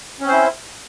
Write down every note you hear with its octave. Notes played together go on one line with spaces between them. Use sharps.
C4 C#4 E4 C5